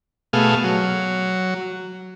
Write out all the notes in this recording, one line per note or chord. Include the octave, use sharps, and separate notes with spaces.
B2 A3 G#4 F5
F#3